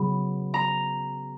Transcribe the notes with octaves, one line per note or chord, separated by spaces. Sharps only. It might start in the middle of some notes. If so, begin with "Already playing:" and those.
Already playing: C#3 F#3 B3 B5
A#5